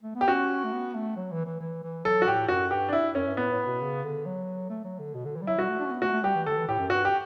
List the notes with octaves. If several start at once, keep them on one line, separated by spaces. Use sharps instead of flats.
A3
B3
G4
C#4 F#4
A3
B3
A3
F#3
E3
E3
E3
E3
F#3 A4
F#4
A2 G4
F#2 F#4
G2 G4
D4
E4
F#2 C#4
G2
A2 B3
A2
B2
C#3
D3
F#3
A3
F#3
D3
B2
D3
E3
G3
F#3 E4
G3 F#4
A3
D4
C#4
B3
A3 F#4
A3
G3 G4
E3
D3 A4
E3
A2 G4
F#2
G2 F#4
G4